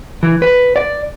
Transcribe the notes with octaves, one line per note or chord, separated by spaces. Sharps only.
E3
B4
D5